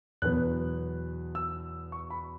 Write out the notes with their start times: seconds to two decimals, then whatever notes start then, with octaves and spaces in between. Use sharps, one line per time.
0.22 E2 B2 F#3 B3 F#6
1.35 E6
1.92 C#6
2.10 B5